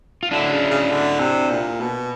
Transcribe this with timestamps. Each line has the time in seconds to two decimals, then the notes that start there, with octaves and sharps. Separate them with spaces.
0.23 F4
0.31 D3 D4 E4
0.51 C#3
0.70 C#3
0.91 D3
1.20 C3
1.51 A#2
1.80 B2